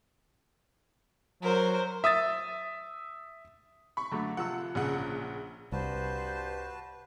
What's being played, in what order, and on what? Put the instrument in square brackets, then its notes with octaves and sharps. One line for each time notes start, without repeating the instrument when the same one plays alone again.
[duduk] F#3 [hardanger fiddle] A#4 C5
[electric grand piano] E5 D#6 E6 A6
[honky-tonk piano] B5 C#6
[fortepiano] F#2 D3 A3
[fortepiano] C3 F3 E6 [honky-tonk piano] F#5
[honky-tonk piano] A#1 C#3 F#5
[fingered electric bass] C2 [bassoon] G2 [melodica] F#4 B4 A5 [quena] C5